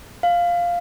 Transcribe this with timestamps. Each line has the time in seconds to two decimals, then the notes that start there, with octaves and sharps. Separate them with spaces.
0.23 F5